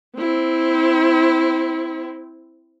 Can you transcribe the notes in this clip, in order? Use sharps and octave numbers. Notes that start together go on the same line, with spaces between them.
C4 E4